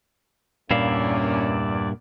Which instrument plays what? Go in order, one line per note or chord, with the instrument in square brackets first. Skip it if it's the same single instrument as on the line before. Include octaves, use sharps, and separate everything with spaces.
[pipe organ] E2 D5 [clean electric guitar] G2 E4 F5 [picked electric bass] A#2 [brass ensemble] A#3 C#4